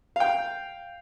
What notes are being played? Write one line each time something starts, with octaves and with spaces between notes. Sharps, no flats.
F5 G5